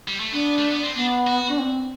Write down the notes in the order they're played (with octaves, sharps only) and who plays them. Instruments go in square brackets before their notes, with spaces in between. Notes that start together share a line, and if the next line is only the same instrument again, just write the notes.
[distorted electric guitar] G3
A3
[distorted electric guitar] B3 [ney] D4
[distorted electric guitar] A3
B3
C4
[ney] B3 [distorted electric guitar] D4
[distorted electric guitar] F#4
[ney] D4
C4